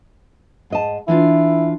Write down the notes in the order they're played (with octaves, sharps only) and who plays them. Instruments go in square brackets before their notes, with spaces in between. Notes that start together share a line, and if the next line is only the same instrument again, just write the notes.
[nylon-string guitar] G#2 D#5 A5
[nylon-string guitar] E3 D4 F4 [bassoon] E4